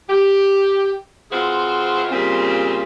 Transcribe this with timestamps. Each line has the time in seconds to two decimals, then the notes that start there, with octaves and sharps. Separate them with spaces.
0.09 G4
1.31 E3 C4 F4 F#4 G#4 C5
2.11 A#2 C#3 G3 C4